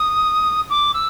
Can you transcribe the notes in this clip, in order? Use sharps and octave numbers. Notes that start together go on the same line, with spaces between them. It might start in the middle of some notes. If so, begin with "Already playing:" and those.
Already playing: D#6
D6
E6